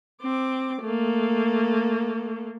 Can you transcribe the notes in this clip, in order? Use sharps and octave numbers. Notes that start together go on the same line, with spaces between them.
C4 D6
A3 A#3